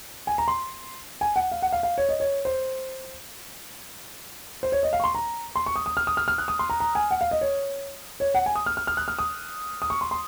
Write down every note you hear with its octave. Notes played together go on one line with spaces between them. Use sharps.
G#5
A#5
C6
G#5
F#5
F5
F#5
F5
F5
C#5
D#5
C#5
C5
C5
C#5
D#5
F5
C#6
C6
A#5
C6
C#6
D#6
D#6
F6
D#6
F6
F6
F#6
D#6
C6
A#5
A#5
G#5
F#5
F5
D#5
C#5
C#5
F#5
G#5
D#6
F6
F6
F6
F#6
F6
D#6
D#6
C#6
C6
C6